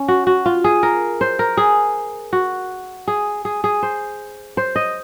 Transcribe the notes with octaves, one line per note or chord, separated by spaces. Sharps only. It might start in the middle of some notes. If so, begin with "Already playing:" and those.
Already playing: C#4
F#4
F#4
F4
G#4
A#4
C5
A#4
G#4
F#4
G#4
G#4
G#4
C5
C5
D#5